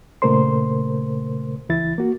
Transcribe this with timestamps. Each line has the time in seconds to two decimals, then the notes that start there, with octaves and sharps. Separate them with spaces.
0.22 A#2 C#3 A3 A#4 C5 C6
1.69 C#2 E3 E4 A6
1.98 A#3 F#4